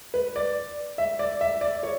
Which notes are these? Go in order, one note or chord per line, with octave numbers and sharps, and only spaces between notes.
B4
D5
E5
D5
E5
D5
C#5